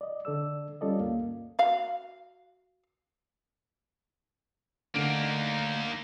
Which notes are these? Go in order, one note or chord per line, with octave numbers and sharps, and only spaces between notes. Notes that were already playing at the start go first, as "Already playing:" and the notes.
D5 D#5
D3 A4 D5 E6
G3 C#4 F4 A4 D5 D#5
D2 G2 A#3 F5
F#4 F5
D3 A3 A#3 D#4 D7